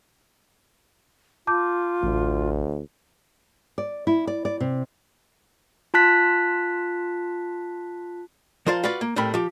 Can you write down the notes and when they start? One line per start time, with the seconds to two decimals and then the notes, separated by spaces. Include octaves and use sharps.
1.47 F4 A5 D6 G6
2.03 A1 D2
3.78 D5
4.07 E4
4.27 D5
4.45 D5
4.60 C3
5.94 F4 A5 F#6 B6
8.66 F3 A#4 C5 D5 F5
8.84 F4 F#4 B4 D5
9.01 A#3
9.16 A2 G3 C4 A#4 B5
9.34 F3 G4